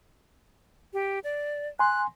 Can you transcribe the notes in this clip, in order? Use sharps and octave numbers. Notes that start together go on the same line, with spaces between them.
G4
D5
G#5 C6 F#6